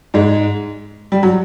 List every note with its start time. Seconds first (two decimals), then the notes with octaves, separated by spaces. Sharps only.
0.14 G#2 G#3
1.12 G3
1.23 F#3